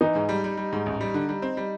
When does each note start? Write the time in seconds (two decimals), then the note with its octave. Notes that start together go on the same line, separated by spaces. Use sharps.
0.01 E3 D#4
0.15 G#2
0.29 G3
0.44 G3
0.57 G3
0.72 G#2
0.86 A1
1.01 G3
1.14 D3
1.29 G3
1.42 C4
1.57 G3